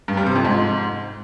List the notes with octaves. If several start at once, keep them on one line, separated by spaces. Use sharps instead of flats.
G2
G3
C3
F2
G#2